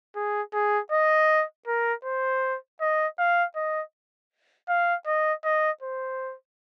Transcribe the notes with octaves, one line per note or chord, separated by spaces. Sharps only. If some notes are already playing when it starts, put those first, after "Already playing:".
G#4
G#4
D#5
A#4
C5
D#5
F5
D#5
F5
D#5
D#5
C5